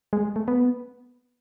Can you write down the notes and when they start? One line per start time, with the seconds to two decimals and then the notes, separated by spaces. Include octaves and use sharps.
0.13 G#3
0.36 A3
0.48 B3